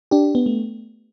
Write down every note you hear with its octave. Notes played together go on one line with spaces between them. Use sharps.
D4 G4
B3
A3